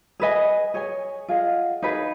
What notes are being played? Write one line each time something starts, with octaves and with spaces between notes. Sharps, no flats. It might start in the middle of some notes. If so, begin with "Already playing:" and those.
G#4 B4 D#5 G#5
G#4 C#5 G#5
F4 G#4 D#5 F#5
D#4 G#4 B4